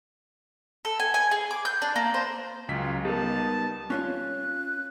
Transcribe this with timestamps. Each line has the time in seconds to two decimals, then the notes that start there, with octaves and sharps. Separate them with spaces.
0.85 A4
0.99 G#5
1.14 G#5
1.31 G#4
1.51 D6
1.65 G6
1.82 D4
1.96 A#3
2.14 C5
2.69 C#2 C#3 F#3 F4 B6
3.05 G3 B3 D#4 G4 A#4 A5
3.90 C#4 F4 C#5 F#6